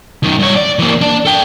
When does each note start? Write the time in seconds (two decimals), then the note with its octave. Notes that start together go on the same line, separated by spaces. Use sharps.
0.23 F#2 D#3
0.39 G2 C#5
0.56 D5
0.79 E3 A#3
1.01 D4 D5
1.25 A4 G5